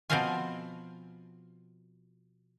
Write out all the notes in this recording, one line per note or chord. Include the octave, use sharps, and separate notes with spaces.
B2 F3 C4 C5 F5 G#5